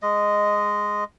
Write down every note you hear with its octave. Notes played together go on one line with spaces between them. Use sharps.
G#3 D#5